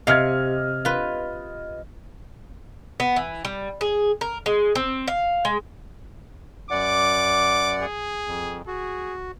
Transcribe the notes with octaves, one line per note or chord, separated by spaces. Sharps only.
C3 D#5 F5 F6 G#6
F4 B4
B3
E3
G3
G#4
A#4
G#3
C4
F5
G#3
F#2 D5 F#5 D6
G#4
F2
F#4 G#4